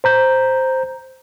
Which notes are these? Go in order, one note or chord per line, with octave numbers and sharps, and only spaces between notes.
C5 A#5 G6